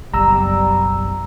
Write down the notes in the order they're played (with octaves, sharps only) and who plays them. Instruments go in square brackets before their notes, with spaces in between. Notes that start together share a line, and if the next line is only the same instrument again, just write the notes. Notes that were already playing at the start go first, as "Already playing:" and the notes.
[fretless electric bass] F#1 B1 [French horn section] G3 [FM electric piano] A#5 E6